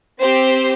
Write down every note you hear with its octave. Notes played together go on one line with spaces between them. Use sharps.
C4 G4 C5